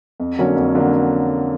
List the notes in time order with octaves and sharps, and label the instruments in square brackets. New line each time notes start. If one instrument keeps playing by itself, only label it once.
[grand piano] F2
D3 F#3 A#3 C#4
F2
D3 F#3 A#3 C#4